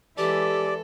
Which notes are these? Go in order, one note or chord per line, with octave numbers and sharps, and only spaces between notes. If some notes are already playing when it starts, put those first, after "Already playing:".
E3 G#3 G4 A4 D5